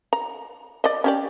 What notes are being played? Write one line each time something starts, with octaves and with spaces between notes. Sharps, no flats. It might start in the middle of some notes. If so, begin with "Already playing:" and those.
A#5
D5 D#5
C#4 G4 D5